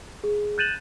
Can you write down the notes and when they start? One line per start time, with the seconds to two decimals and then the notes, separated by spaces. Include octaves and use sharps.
0.24 G#4
0.58 F#6 G6 A6 D#7 E7 F#7